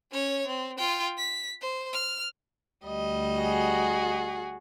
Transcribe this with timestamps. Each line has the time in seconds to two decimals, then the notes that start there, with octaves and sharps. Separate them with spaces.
0.12 C#4 C#5
0.47 C4
0.77 F4 G5
1.18 B6
1.61 C5
1.93 F6
2.86 D2 G3 D#5
3.39 F#4 G#4